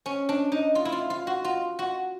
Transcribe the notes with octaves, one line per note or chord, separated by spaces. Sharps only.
C#4
D4
D#4
F4
E4
F4
F4
F#4
F4
F#4